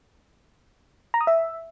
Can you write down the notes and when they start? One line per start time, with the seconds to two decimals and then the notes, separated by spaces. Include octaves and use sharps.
1.14 A#5
1.21 D#6
1.27 E5